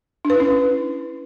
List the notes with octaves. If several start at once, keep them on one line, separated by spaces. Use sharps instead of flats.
D4
B4
E4
C#4